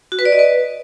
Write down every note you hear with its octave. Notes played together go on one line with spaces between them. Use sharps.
F#4
B4
D5
D#5
B4